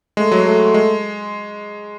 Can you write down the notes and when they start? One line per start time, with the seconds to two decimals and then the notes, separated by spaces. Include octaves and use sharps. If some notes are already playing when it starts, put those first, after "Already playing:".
0.17 G#3 A3
0.31 F#3
0.46 A3
0.74 G#3